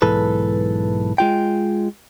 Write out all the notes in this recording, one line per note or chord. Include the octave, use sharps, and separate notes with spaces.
B1 G#2 E3 A4 B4
G#3 F4 G5